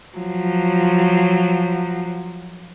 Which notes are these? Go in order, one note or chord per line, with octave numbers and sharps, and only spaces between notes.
F3 F#3